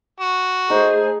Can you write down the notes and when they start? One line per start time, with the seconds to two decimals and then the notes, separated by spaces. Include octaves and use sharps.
0.20 F#4
0.70 A3 D#4 G#4 C5